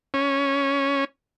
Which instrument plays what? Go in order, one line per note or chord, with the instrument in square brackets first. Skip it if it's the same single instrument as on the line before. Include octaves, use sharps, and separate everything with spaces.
[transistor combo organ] C#4